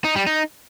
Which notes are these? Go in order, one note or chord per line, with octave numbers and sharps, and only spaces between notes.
D#4
G3
D#4